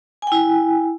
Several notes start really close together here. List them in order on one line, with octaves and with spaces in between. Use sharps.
G#5 G5 E4